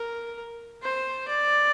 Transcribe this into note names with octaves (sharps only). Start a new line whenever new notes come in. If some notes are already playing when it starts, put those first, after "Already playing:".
Already playing: A#4
C5
D5